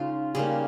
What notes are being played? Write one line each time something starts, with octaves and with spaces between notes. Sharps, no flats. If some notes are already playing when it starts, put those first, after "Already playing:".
Already playing: C#3 G#3 C#4 D#4 F4
C#3 G3 A#3 G#4